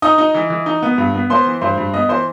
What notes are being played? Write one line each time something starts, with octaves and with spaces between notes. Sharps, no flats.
D#4 D#5 D#6
D#4
E3
E3
D#4
B3
G2
B3
B3 C5 C6
E3
G2 C5 C6
G2
B3 D#5 D#6
E3 C5 C6